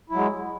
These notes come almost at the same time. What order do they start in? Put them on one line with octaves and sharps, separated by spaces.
E4 F#3 G#3